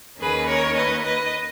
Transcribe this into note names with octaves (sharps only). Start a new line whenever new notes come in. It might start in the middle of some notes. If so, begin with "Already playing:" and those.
D#2 D#3 A#3 C#4 G#4 B4
A#4 C#5
B4 D#5
B4 D#5